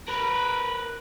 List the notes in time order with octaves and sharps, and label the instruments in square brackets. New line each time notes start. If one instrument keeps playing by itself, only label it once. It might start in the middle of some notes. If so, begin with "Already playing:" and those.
[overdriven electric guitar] A#4 B4